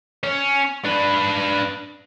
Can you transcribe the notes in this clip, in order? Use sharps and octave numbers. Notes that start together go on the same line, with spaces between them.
C#4
D4 B4